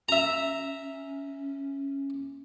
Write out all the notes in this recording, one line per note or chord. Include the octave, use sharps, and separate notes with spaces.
C#4 E5 A#5